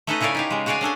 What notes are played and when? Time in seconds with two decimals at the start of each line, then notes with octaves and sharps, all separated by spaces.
0.07 A3 C#4 D#4 A4 B4 D#5
0.21 C#3 E4 C#5 D5 F5 G#5
0.35 D#4 G4 F5
0.51 C#3 G#3
0.66 F#4 G#4 C#5 D5 F5 G#5
0.81 C#4 D4 A4 G#5